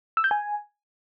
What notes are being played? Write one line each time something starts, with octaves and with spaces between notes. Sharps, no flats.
E6
G6
G#5